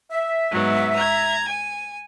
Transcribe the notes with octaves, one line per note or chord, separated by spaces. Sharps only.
E5
G#2 F#3 B3
A#5 G#6
G#5